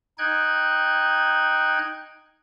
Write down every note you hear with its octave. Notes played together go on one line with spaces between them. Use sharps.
D#4 G5 F#6 G#6